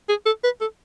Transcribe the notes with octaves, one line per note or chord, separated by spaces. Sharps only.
G#4
A4
B4
A4